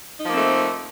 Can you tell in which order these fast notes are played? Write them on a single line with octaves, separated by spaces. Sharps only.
D#4 F3 A#3 C4 A3